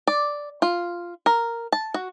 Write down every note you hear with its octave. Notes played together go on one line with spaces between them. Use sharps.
D5
F4
A#4
A5
F#4